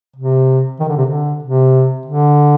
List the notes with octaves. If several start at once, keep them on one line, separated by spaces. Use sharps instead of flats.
C3
D#3
D3
C3
D3
C3
D3